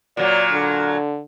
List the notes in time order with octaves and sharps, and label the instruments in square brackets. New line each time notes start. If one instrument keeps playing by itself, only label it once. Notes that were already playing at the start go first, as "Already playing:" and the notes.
[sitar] A#2 F#3 [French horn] D5
[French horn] D3